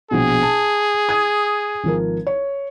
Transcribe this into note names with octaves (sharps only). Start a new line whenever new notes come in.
A#1 B2 G#4
A5
D#6 G#6
G#1 F3 A#4
C#5